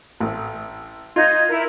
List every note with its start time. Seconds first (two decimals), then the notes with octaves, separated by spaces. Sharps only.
0.20 A1
1.16 D#4 F4 G#6
1.49 E4 A#4